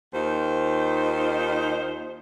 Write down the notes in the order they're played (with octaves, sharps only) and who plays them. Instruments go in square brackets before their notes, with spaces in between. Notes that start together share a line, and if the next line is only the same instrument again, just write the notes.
[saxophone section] D#2 D#4 F4 C5